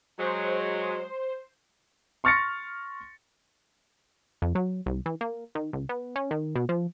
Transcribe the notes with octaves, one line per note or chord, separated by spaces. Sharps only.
F#3 G#3 C5
C6 C#6 F6 A6 A#6 C#7
F2
F#3
C2
E3
A#3
D#3
C#2
B3
C#4
D#3
B2
F3